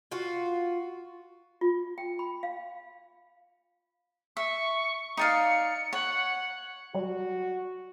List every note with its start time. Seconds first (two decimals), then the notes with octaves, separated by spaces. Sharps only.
0.12 F4 F#4
1.61 F4
1.98 G5
2.19 B5
2.43 F5
4.37 E5 C#6
5.17 D#4 D5 F5 C#7
5.93 C#5 F#5
6.95 F#3 G3 F#4